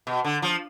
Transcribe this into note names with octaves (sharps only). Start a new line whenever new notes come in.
B2
D3
F3